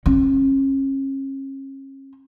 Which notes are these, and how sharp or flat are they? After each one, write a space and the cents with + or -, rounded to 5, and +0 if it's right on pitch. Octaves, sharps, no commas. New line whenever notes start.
C#4 -35